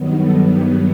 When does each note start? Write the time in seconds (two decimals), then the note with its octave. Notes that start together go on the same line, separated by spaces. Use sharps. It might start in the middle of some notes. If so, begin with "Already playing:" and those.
Already playing: G2 D#3 F#3 B3
0.21 A4
0.50 G4